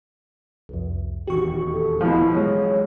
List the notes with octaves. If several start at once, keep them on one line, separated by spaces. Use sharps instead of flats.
C2 F2
D#1 E2 D#3 F#4 G4 C#6
A4
B2 F3 E4
A1 F#3 G#3 C#5